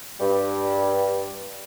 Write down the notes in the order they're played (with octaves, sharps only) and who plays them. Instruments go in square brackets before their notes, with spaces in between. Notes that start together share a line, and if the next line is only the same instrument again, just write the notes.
[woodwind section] G2 G3